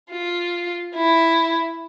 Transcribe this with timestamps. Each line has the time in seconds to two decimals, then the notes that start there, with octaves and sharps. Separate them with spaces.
0.11 F4
0.96 E4